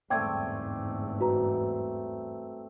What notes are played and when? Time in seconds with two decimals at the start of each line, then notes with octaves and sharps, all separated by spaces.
0.10 G1 E2 G#2 A3 C4 D5 G5 G#6
1.21 F#4 B4 A#5